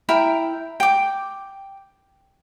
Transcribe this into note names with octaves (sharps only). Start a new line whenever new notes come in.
E4 A#4 G5
G5 D6